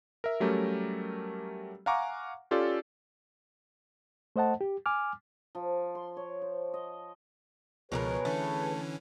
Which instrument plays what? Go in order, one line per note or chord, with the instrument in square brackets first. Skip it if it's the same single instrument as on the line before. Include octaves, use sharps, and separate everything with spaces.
[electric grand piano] A#4 E5
F#3 G3 A3 C#4 G4 A#4
F5 F#5 G#5 A#5 C#6 D6
C#4 F4 G4 A4 D5
[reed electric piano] A3 C5 D#5 F#5 A5
G4
G#5 D6 F6
[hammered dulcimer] F3
C6
C#5
C5
D#5
[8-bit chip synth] C#2 F3 [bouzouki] B2 G4 A#4 [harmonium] G#4 B4 C#5
[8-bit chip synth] D3 E3 C#4 [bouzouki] A3